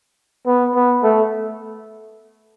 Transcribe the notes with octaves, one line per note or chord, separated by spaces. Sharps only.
B3
B3
A3